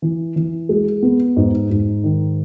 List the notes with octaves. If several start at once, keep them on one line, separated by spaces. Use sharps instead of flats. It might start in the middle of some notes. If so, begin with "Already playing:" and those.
E3
E3
G#3
B3
G#2
G#2
D#3